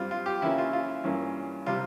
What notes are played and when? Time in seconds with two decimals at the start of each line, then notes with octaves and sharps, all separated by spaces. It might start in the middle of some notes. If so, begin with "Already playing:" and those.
Already playing: G2 G3 C4 F4
0.11 F4
0.26 G4
0.41 C#3 E3 A#3 C#4 E4
0.58 F4
0.73 F4
1.04 G2 E3 A#3 C#4
1.66 C3 G3 F4